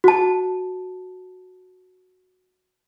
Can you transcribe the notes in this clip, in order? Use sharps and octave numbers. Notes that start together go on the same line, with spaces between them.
F#4 A5